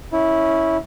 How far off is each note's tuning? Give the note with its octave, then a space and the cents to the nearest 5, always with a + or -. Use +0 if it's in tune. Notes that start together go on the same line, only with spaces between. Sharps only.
C#4 +0 E4 -15